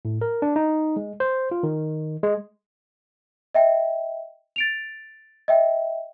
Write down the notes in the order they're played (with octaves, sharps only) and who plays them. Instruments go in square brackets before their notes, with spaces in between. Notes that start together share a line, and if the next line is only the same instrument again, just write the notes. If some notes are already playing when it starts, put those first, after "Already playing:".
[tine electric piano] A2
A#4
D4
D#4
G#3
C5
F4
D#3
G#3
[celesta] D#5 E5 G5
A6 D7 F7
D#5 E5 G5